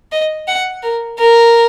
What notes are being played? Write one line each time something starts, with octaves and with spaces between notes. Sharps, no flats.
D#5
F#5
A#4
A#4